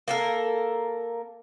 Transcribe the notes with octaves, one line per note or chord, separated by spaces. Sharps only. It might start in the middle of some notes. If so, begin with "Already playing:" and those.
A#3 A4 A#4